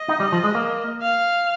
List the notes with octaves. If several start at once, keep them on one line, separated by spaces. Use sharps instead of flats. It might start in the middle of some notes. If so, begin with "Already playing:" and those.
Already playing: D#5
D#4
G3
F3
G#3
A#3
F5